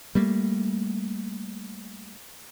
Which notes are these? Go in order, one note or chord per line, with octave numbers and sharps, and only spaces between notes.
G3 A3 A#3